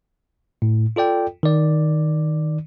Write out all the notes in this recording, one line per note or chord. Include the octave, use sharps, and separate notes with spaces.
A2
F4 A4 D5 G5
D#3 D5